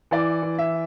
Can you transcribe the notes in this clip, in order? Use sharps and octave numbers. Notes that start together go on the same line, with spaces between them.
E3 D5
E3
E5